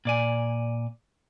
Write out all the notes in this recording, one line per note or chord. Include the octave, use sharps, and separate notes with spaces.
A#2 D5 G#5